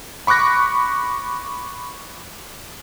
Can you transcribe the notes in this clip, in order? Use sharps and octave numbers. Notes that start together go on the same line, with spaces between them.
B5 C#6 D6 F#6 A#6